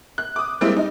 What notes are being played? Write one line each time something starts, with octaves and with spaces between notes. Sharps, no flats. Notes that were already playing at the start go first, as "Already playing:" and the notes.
F#6
D6 D#6
G3 G#3 A#3 C4 E4
D#4